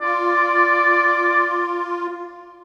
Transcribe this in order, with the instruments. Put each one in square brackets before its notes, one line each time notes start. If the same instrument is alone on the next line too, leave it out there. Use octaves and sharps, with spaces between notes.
[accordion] F4 [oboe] D5